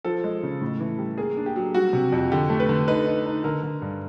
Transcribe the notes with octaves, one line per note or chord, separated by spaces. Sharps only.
F3 A4
G#3
C#3
A2
E3
G3
A#3 G#4
D4
G4
F#3
G3 F#4
C3
F2
D3 G4
A3
B4
D3
D#4 B4
D#4
D#4
D3 A#4
D3
G2